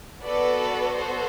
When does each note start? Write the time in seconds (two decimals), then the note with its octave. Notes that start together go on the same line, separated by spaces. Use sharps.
0.23 B3 F#4 A4 B4 D5
0.96 A4 C5